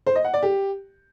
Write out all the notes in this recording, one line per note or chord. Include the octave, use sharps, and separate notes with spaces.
C5
D#5
F#5
D5
G4